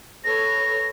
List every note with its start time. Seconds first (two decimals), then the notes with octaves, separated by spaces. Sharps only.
0.24 A4 B4 C#5 A#6